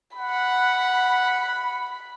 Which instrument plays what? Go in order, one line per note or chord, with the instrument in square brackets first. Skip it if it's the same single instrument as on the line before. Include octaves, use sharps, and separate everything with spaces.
[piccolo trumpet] F#5 [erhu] B5